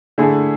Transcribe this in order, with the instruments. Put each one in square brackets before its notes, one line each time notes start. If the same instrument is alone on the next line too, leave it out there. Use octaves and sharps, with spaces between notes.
[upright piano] D3 A3 E4 G#4